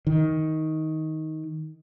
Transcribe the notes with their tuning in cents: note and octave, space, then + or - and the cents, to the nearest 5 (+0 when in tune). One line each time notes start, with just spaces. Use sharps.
D#3 +15